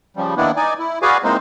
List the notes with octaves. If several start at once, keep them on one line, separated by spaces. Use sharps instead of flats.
C#3 F3 G3
D#3 E3 A#3 B3 D4 E4
D#4 D5 G#5
E4
F#4 G#4 B4 D5 F5 G#5
E3 G#3 A#3 C4 D#4 C5